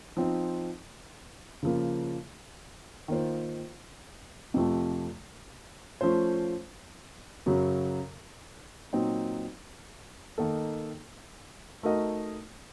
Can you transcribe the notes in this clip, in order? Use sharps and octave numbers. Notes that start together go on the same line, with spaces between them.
F3 C4 D#4
C#3 F3 A#3
D#3 A#3 F4 C5
F2 C3 F3 A3
F3 A3 C#4 F4 C5
F#2 C#3 F#3
A#2 F#3 C4 D#4
D#3 A#3 D#4 A4
A3 D#4 F#4 A#4 D#5